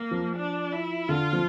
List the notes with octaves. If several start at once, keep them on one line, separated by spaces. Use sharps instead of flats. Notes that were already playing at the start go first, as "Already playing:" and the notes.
Already playing: A#3
F3
D4
E4
D3 F4
F3